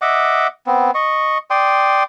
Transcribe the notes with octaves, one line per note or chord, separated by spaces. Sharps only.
D#5 E5 F#5 D6
B3 C4
D#5 C#6
D5 G5 C6 D#6